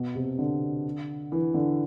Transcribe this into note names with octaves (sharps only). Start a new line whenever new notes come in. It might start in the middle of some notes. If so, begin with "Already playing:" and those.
Already playing: B2
C3
D3
E3
D3